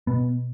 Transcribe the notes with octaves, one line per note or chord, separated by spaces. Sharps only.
B2 B3